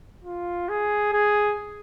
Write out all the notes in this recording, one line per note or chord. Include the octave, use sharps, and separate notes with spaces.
F4
G#4
G#4